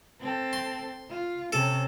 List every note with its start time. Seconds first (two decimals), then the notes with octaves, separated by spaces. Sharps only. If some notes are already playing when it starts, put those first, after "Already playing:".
0.20 C4 A4
0.53 C6
1.09 F4
1.53 C3 C#4 A4